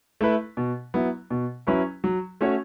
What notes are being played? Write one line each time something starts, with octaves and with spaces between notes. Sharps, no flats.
A3 E4 B4
B2
F#3 B3 E4
B2
F#3 C#4 E4 B4
F#3
A3 C#4 F#4 C#5